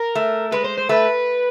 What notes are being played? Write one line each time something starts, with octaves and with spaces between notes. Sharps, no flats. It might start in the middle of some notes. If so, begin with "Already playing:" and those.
Already playing: A#4
A3
G#3 B4
C5
C5
A3 B4